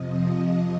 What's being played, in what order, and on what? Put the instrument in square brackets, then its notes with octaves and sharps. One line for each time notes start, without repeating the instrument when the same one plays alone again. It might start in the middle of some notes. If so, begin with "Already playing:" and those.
Already playing: [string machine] F2 C3 F3 D#5